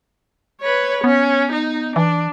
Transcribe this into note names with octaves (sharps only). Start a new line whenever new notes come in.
B4 C#5
B3 C#4
D#4
E3 D4